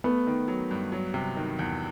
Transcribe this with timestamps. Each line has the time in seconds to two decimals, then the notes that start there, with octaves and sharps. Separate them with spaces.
0.04 A3 B3
0.27 D#3
0.48 F#3
0.71 G2
0.92 F#3
1.14 C3
1.37 D#3
1.59 E2